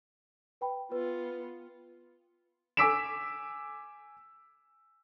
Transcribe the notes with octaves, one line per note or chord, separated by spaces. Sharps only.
B4 G5 B5
B3 F4 B4
G#5 D6 E6 B6 D7 E7